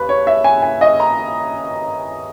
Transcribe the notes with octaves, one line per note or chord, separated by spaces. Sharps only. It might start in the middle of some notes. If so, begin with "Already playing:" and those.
Already playing: D#2 C#3 B4
C#5
E5
G#5
G#5
D#5
A#5